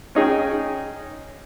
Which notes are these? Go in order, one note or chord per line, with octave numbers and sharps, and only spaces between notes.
C#4 D#4 G#4 G5